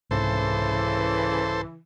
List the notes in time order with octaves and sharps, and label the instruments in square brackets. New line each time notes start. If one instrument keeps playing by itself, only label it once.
[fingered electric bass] C2 G#2 [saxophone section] C#3 E3 [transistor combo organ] A4 C5